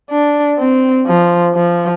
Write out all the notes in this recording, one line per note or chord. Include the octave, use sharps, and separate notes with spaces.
D4
C4
F3
F3